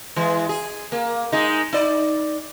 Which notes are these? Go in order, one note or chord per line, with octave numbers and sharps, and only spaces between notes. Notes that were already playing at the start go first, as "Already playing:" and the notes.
E3 G#3
G#4
A#3
G#3 D#4
D#4 D5